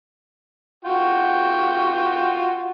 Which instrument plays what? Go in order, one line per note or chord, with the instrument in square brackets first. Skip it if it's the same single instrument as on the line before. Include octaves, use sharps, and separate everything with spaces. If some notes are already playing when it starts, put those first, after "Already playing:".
[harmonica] F4 F#4 G5